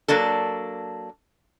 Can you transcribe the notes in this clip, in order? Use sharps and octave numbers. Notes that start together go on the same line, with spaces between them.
F#3 A#3 D4 A4